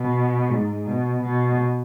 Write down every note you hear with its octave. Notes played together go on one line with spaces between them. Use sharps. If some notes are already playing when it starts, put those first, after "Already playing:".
Already playing: B2
G#2
B2
B2